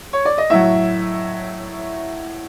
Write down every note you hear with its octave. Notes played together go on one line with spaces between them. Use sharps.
C#5
D5
D#5
A2 F#3 E5